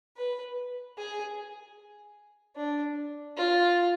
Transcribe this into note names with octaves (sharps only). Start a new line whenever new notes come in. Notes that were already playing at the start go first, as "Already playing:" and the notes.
B4
G#4
D4
F4